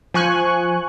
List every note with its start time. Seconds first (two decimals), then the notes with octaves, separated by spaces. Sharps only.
0.14 F3 G#5 C#6 F#6